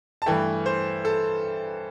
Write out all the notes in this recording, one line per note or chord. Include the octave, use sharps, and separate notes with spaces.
A5
G2 E3 A3 G5
C5
A4